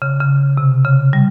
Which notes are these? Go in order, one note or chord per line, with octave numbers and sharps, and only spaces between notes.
C#3
C#3
C3
C#3
G3